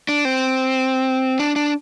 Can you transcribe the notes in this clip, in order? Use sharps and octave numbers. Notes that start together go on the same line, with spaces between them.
D4
C4
D4
D4